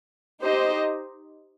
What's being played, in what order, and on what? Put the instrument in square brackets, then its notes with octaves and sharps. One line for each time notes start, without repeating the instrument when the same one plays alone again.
[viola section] D#4 G4 C5 D#5